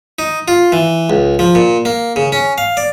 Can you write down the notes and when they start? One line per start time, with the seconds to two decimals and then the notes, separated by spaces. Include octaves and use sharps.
0.19 D#4
0.48 F4
0.72 E3
1.10 C#2
1.39 F3
1.55 A#2
1.85 A#3
2.16 C#3
2.32 C#4
2.58 F5
2.77 D5